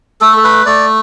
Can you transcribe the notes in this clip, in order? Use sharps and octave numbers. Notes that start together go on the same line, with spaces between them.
A3 A4
A4
B4
A3 D5